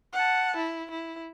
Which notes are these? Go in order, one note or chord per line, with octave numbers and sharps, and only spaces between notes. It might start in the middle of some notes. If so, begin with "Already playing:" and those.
F#5 A5
E4
E4